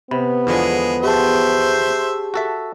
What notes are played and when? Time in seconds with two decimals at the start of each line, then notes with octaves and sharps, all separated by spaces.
0.11 C3 B3 B5
0.47 E2 D3 F3 G#3
1.03 G4 G#4 C5 E5 A5
2.34 F#4 A4 E5